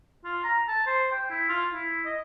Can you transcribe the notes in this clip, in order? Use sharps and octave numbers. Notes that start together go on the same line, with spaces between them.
F4
A#5
A5
C5
G5
E4
F4
E4
D#5